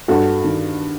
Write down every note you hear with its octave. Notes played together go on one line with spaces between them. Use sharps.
G2 F#4 A4
D#3